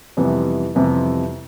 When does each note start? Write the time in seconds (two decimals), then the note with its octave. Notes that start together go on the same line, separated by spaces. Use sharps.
0.17 F2 C3 E3 G3 B3
0.75 F2 C3 E3 G3 B3